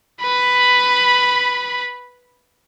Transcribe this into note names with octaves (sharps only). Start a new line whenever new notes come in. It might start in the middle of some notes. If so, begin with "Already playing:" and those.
B4 B5